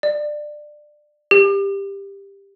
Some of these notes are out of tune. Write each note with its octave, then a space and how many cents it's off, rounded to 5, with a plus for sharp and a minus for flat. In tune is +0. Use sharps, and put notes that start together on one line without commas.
D5 +20
G4 +15